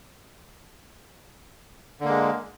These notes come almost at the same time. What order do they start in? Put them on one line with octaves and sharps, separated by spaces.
D3 A#3 G#3